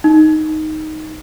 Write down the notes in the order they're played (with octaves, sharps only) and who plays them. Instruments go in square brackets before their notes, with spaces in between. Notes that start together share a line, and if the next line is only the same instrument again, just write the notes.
[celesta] D#4